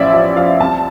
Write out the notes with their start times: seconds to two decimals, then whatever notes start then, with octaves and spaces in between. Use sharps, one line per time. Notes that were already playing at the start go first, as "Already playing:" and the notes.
Already playing: A1 F3 D5 E5
0.14 F3 E5
0.37 F3 F5
0.60 C2 A5